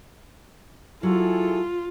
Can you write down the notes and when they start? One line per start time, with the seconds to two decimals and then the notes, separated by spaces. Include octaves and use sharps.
1.03 F#3 E4 F4 G#4 A4